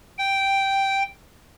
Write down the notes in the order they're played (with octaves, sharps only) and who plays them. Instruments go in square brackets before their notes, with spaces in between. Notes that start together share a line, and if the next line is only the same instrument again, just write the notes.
[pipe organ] G5